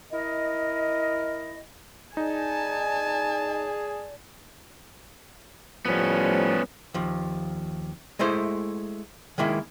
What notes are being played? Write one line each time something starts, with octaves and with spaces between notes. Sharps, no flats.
E4 A#4 D#5
D#4 G#4 D5 G#5 A5
A2 F3 G3 B3 C#4
D#2 F3
G#3 A3 E4 C5
D#3 G#3 A#3 E4